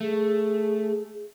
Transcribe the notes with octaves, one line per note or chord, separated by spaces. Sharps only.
A3 G#4